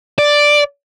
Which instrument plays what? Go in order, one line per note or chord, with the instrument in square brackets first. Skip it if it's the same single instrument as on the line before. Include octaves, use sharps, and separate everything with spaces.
[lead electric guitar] D5